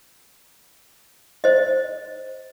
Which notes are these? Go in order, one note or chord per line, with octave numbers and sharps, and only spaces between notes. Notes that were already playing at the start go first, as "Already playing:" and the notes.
C5 D#5